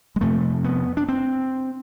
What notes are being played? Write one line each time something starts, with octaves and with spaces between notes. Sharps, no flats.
G#3
F2 C3 A3
B3
D4
C4